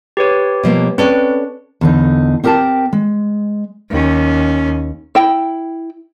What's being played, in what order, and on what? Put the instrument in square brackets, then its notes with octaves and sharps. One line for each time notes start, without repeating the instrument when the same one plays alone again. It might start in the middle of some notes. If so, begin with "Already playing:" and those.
[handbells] G4 B4 C#5
[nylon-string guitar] B2 F3 A#3
[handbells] C4 B4 [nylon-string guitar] C#4 A4 D5
[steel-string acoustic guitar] E2 D3 D#4
C4 G4 A#4 G5 A5
G#3
[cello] D#2 C#4
[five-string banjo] E4 G5